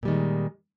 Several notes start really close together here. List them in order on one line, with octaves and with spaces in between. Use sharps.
A#2 G3 D#3 G#3